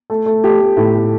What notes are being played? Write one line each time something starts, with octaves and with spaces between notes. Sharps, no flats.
A3
A3
A3 G4
A3
A2 A4
A3